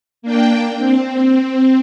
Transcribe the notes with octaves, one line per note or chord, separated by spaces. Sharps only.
A#3 D4 G5
C4